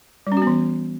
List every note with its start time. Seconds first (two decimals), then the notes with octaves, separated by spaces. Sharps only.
0.27 G3
0.32 C#4
0.37 F#4
0.42 B3
0.47 E3